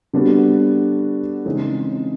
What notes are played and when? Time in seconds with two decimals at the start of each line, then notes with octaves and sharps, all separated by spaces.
0.13 D3 G3 B3 D4 F#4
1.45 C#3 E3 G#3 C4 D#4